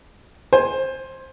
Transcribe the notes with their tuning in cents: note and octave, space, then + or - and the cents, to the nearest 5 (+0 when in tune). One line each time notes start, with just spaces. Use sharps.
C5 +15 G#5 +0